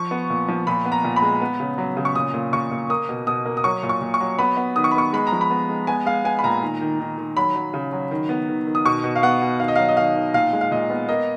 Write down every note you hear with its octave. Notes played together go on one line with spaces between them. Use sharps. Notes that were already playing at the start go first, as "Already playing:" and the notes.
Already playing: F3 C#6
B3
A#2
F3
A#2 B5
B3
A#5
A#2
B5
G#3
B3
C#3
F#3
C#3
C#6
A#2 D#6
A#2
A#2 C#6
A#2
A#3 D#6
B2
B2 D#6
A#3
D#6
F#3 C#6
A#2
C#6
A#2
C#6
F#3
B3 B5
B3
D#3 D#6
C#6
B5
B3 C#6
G#3 B5
A#5
F3
B5
B3
G#3
B3 G#5
G#3 F5
B3 G#5
B5
A#2 A#5
D#3
D#3
D#3
D#3
F#3 B5
F#3
C#3
F#3
D#3
B3
D#3
D#3
D#6
B2 C#6
B2
F5
B3 F#5
B2
D#3 F5
D#5
F#3 F5
D#5
D#3 F5
D#3
A#2 F5
G#3
F5
A#2 D#5
B3
A#3 D#5